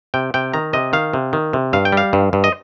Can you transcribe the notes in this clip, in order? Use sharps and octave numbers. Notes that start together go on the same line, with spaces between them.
C3 G5
C3 G5
D#3 A#5
C3 D#5
D#3 F5
C3
D#3
C3
G2 F5
G5
G3 F5
G2
G2
D#5